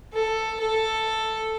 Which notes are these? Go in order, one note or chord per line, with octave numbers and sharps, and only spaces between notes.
A4
A4